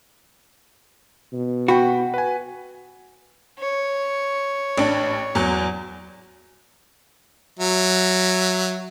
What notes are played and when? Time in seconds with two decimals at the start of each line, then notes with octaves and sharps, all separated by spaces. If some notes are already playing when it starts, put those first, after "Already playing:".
1.33 B2
1.68 F#4 G5 B5
2.14 B4 G#5
3.59 C#5
4.78 A1 D4
5.35 E2 F#3
7.60 F#3 E5